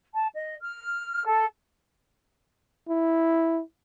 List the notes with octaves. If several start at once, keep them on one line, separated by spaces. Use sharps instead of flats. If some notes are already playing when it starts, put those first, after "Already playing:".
A5
D#5
F6
A4
E4